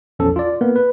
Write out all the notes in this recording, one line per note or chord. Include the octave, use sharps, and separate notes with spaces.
A#1 E2 F3 C#4 A4
F4 D5
A#3 B3 A#4 B4
B4